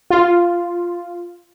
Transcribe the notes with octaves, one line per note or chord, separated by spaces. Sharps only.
F4